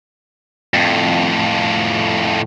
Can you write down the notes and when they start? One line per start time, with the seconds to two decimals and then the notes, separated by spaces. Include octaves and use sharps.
0.74 F2 A2